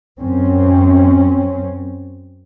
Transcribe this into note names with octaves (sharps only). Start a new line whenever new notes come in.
F#2 C4 C#4